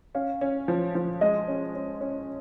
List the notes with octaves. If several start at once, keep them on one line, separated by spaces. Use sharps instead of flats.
C#4 F5
C#4
F3
F3
G#3 D#5
C#4
C#4
C#4